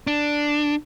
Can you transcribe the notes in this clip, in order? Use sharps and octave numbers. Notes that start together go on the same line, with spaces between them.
D4